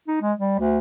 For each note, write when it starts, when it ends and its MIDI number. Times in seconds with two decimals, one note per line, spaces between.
0.08 0.17 63
0.22 0.33 56
0.38 0.56 55
0.59 0.79 38